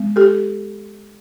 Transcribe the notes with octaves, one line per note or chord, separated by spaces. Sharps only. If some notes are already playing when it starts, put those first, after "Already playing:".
Already playing: G#3 B3
G4 A4